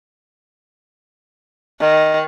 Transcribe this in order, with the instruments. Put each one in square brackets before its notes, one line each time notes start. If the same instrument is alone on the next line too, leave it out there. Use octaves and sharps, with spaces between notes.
[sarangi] D#3